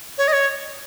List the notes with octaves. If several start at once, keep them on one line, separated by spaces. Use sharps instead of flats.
C#5
D#5
C#5